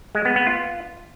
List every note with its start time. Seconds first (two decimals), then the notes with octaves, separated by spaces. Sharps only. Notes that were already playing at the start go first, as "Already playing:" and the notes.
0.15 G#3
0.25 B3
0.36 B3
0.47 F4